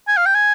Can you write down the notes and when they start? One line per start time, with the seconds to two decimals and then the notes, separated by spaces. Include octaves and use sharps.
0.08 G#5
0.17 F5
0.26 G5
0.35 G#5